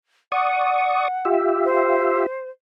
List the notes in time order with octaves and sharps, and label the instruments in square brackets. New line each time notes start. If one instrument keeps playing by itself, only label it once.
[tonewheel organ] D5 C#6 D#6 [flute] F#5
[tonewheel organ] F4 G4 E5
[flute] C5